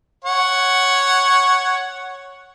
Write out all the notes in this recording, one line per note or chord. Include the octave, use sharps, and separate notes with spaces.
C#5 F#5